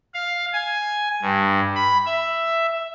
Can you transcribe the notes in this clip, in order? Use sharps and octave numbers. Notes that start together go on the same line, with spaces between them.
F5
G#5
G2
B5
E5